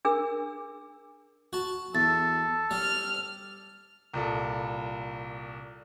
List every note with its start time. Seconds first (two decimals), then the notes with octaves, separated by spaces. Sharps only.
0.05 D4 G#4 A#4 E6
1.53 F#4 A5
1.95 E2 A4 A6
2.71 G3 F6
4.14 C2 A#2 A4